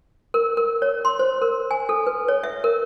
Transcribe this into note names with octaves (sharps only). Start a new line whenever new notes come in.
A#4
A#4
C#5
C6
C5
A#4
G#5
A4
B4
C#5
E5
A#4